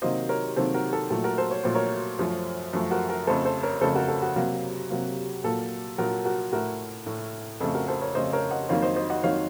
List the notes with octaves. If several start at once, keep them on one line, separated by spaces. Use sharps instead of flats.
C3 D#3 F#3 A#3 C5 D#5
A#4 C#5
C3 D#3 F#3 A#3 A4 C5
F#4 A#4
A4
A#2 F#3 A3 A4
F#4 A#4
A4 C5
C#5
A#2 F#3 A3 C5
A#4 C#5
F#2 F3 A3
F#2 F3 A3
F#4 A#4
F#4 A#4
F2 C#3 A3 A4 C5
A4 C5
A#4 C#5
F2 C#3 A3 A4 C5
F#4 A#4
A4
F#4
C3 F#3 A#3
C3 F#3 A#3
A#2 F#3 A#3 A4
A#2 F#3 A#3 F#4 A#4
F#4 A#4
A2 A3 F#4 A#4
A2 A3
F2 C#3 A3 A4
F#4 A#4
A4 C5
A#4 C#5
F2 C#3 A3 C5 D#5
A#4 C#5
D#5 F#5
F2 D#3 F#3 A#3 C#5 F5
C5 D#5
C5 D#5
D#5 F#5
F2 D#3 F#3 A#3 C#5 F5